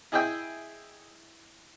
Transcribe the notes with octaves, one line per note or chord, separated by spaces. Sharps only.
E4 G#4 D#5 E5 G5 D#6